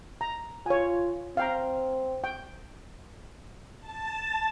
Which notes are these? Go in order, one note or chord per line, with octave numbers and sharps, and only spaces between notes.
A#5
F4 C#5 G#5
C4 F5 G5 A#5
G5
A5